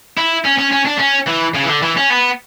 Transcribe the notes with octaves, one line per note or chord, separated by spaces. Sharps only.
E4
C#4
C#4
C#4
D4
C#4
E3
C#3
E3
D3
E3
C#4
B3